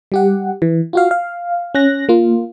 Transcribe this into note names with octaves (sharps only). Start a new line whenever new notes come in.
G3 G4 F#5
E3
F4 F#4 F5
F5
C#4 F#6 A#6
A#3 F4